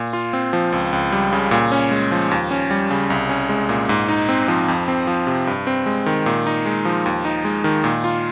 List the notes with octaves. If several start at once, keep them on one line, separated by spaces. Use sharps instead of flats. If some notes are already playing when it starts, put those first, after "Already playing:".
Already playing: A#2
F4
C4
F3
C#2
C#2
G3
C#3
A#2
C#4
G#3
F3
D#2
C#4
G3
C#3
C2
C#4
G#3
A#2
G#2
D#4
C4
F3
F2
C4
F3
C3
G2
C4
G#3
D#3
A#2
D#4
G#3
F3
D#2
D#4
G#3
D#3
A#2
F4